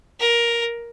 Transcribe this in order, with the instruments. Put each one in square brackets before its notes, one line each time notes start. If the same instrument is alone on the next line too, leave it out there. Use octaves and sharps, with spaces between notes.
[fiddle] A#4